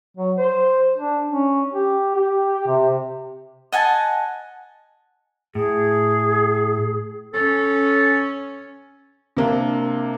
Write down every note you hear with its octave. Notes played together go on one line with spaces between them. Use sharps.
F#3
C5
D4
C#4
G4
G4
C3
D#5 F#5 G#5 A5
A2 G#4
C#4 A4
C3 A#3 D4